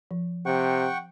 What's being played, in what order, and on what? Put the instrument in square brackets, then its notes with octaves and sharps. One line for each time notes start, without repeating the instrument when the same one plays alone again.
[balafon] F3
[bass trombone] C3 [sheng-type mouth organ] F#5 G5 C#6